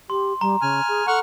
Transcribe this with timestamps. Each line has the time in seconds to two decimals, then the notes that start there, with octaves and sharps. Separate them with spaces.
0.10 G4 C6
0.41 G3 A#5
0.62 C#3 G#5 F6
0.88 G#4
1.07 A4 F#5 C#6 F6